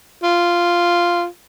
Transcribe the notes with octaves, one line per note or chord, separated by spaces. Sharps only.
F4